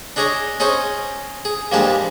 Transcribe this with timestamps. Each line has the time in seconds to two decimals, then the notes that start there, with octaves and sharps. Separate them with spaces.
0.16 D4 D#4 G#4 C#5 A#5
0.60 C#4 D#4 G#4 C5 C#5
1.45 G#4
1.72 G2 A#2 F3 G3 G#3 A5